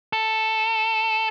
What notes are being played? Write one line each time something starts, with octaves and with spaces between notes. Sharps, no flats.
A4